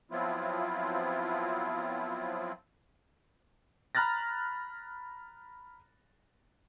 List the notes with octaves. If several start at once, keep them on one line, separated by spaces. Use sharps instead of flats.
F3 F#3 B3 C4 E4 F4
A#5 B5 F6 F#6 A6 A#6